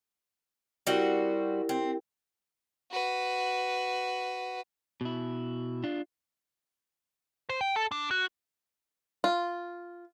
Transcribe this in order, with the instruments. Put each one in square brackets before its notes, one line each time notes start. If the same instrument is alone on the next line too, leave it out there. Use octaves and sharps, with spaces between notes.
[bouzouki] G3 C4 F#4 [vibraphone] E4 G4 A#4
[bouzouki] C4
[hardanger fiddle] F#4 B4
[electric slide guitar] B2 E4
D4 F4
[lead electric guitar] C5
G5
A4
D4
F#4
[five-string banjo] F4